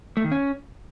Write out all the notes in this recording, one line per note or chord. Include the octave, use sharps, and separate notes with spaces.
A3
D#3
C#4